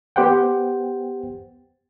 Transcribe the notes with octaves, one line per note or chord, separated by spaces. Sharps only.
B3 G4 C5 F#5 G5